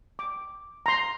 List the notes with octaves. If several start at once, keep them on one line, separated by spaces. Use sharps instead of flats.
D6
A#5 C6